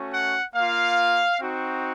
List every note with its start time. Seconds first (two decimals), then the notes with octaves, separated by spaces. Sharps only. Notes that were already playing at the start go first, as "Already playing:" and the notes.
Already playing: A3 C#4 F#4
0.12 F#5
0.55 A#3 F4 F5
1.41 C4 D#4 F#4